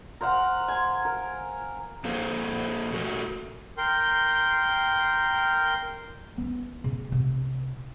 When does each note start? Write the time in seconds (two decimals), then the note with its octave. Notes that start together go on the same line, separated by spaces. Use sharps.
0.21 A#4 C5 F5 F#5
0.68 G#5 C6
1.05 A#4
2.05 F3 A#3 A4 C5
2.93 A3 F#4 A#4
3.78 A#4 G5 C6
6.37 B3 C#4
6.84 C#3
7.12 C3